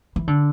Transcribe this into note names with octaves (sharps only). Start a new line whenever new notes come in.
E3
D3